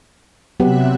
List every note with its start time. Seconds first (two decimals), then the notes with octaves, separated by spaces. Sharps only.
0.60 C3 F#3 B3 G4 E5 F#6